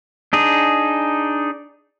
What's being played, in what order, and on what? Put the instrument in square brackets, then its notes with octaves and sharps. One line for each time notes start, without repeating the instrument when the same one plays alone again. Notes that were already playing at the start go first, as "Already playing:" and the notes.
[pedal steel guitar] D4 D#4 G#4